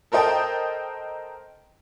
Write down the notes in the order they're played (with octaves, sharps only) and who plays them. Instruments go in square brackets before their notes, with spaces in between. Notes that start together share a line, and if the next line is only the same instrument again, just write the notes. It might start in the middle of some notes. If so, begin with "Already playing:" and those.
[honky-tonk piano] A4 A#4 C5 D#5 G5 A5